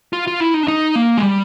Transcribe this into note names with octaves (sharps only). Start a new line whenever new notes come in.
F4
F4
E4
D#4
D4
D#4
A#3
G#3
G3